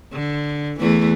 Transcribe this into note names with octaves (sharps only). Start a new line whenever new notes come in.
D3
E2 E3 A3